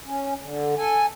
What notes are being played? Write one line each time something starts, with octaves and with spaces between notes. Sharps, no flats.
C#4
D3
A4 G#5